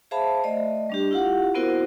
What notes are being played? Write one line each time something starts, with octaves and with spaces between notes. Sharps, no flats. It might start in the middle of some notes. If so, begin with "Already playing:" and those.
G#4 C5 E5 F5 A5 B5
A3 D5 D#5
G3 D4 G4
E4 F4 G4 F5 F#5
B3 C4 E4 F#4 A#4 C5